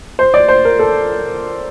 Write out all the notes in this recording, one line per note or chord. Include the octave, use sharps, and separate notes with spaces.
C5
D5
C5
A#4
A4